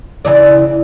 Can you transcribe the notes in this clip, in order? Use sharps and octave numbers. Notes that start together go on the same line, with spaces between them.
C#3 E3 D5